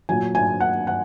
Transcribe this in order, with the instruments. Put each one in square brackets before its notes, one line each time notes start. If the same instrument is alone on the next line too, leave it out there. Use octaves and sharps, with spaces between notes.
[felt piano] A#2 F#3 G#5
G#5
F#5
F#5